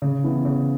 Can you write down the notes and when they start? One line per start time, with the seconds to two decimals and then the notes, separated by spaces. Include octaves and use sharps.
0.02 C#3
0.24 E3 B3
0.45 C#3